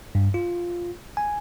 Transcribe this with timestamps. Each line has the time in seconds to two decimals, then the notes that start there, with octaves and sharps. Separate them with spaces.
0.15 G2
0.34 F4
1.17 G#5